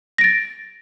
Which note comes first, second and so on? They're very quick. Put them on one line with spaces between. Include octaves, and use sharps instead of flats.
A#6 D7 A6